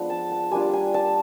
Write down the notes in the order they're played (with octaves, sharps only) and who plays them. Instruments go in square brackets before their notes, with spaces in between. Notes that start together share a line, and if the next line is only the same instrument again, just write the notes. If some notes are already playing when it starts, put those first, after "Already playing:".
Already playing: [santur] F3 G#3 B3 D4
A5
A5
G3 A#3 D4 F4 G#5
G#5
A5